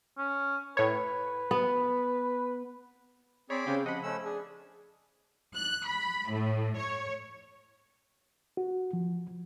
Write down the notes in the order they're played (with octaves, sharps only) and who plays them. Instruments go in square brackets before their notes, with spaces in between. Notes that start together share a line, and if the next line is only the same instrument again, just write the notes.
[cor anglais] C#4
[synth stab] A2 C#5 [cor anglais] B4
[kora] B3
[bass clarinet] C4 [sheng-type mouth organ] G#4 D5 B5 [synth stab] C#5
[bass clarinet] C#3 [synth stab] C4 C#4 G4
[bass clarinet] F3 [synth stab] D#5 B5 [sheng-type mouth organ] F#5
[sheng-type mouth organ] A3 C#4 E6
[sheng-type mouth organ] D4 [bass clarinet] G#4
[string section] F#6
B5
A2
C#5
[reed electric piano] F#4
F3